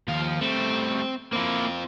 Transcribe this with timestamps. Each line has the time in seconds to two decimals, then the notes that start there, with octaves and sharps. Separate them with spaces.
0.08 D#2 F3 F5
0.41 G3 A3 C4
1.33 A#3 C4 E4 F4